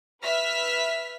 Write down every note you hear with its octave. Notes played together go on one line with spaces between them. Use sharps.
B4 E5 F6 B6